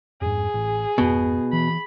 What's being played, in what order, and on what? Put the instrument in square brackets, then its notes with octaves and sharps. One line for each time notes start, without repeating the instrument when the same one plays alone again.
[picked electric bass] F2 G#2 [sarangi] G#4
[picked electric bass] A1
[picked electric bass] G#1 F2 [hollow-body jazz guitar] B2
[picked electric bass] E3 [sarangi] B5